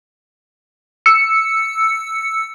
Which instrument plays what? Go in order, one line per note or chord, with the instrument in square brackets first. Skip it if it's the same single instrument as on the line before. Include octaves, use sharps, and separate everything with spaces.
[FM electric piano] E6 C#7